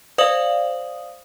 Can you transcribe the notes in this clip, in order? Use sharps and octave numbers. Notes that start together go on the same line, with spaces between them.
C5 D5 F5 D#6 F#7